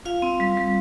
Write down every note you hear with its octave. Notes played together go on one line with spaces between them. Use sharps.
F4 F5
C4
G3
G3